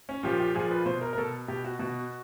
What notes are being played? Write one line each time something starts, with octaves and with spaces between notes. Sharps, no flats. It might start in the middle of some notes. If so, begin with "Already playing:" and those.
C#4
A#2 F3 G4
G4
A#2 F3 G#4
B4
B2 C5
A#4
A#4
B2 A4
B2 G4
F#4
B2 F#4